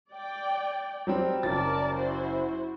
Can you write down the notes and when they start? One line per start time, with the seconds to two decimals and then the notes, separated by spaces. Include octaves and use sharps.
0.11 D5 G5
1.07 F#3 G3 C4
1.43 F#1 F#3 A#4 D5 A5 A6
1.95 E4 F#4 C5